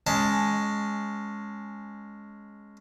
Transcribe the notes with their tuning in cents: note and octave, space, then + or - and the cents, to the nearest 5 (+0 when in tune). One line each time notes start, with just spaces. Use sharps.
G#3 +0 C#4 +0 A5 +10